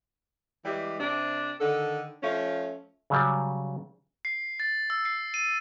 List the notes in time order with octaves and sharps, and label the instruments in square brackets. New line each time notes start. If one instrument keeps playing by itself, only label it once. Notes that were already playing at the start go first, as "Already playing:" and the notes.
[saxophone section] E3 G3 G#3 G4
C3 D4
D3 D#3 A4
F3 A3 C#4
[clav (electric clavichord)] C#3 F#3 G3
[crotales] C7
A6
E6
C7
D#7